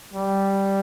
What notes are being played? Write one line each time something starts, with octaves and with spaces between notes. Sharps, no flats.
G3